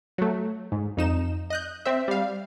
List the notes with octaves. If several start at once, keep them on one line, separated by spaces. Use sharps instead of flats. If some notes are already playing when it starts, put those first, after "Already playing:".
F#3 A3
G#2
F2 D#4 E7
D#5 F#6 G6
C4 C5 E5
G3 F5